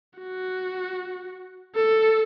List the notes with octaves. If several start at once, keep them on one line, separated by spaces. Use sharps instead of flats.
F#4
A4